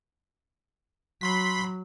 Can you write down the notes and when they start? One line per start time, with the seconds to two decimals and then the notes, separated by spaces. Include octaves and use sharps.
1.21 F#3 B5 C6 B6